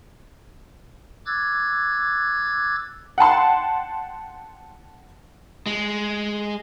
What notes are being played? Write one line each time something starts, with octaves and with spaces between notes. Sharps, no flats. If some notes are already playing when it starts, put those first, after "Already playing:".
D6 E6 F#6 G#6 A6
F#5 G5 A5 C6
G#3